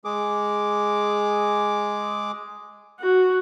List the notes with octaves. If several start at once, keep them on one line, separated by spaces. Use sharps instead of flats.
G#3 G#4 D6
F#4